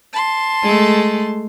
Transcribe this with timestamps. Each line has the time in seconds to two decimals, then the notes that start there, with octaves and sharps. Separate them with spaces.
0.13 A5 C6
0.63 G#3 A3